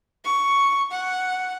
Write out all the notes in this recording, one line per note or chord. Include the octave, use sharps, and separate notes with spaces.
C#6
F#5